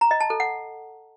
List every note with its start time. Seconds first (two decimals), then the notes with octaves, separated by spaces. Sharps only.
0.01 A#5
0.11 D#5
0.21 A5
0.30 A4
0.40 F#5